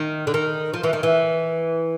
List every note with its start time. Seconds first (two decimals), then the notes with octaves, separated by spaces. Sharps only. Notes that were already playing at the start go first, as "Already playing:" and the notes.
Already playing: D#3
0.27 D3
0.34 D#3
0.74 F3
0.83 E3
0.93 D#3
1.03 E3